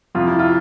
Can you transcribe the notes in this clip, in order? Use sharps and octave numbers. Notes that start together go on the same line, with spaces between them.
F2 C3 F3 F4
E4
F4